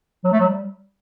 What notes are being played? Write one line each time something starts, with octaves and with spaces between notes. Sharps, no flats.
F#3
A3
F#3
G3